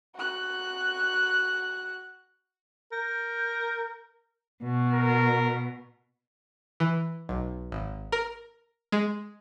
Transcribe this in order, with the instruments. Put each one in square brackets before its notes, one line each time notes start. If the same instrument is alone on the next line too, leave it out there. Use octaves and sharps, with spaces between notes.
[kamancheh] F#4 F#6
[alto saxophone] A#4 [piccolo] G6
[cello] B2
[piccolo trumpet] A#4
[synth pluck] E3
B1
G#1
A#4
G#3